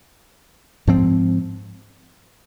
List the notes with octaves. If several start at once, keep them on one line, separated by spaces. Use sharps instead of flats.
G#2 F3 C4